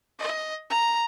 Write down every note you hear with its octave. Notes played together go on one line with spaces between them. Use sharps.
D#5
A#5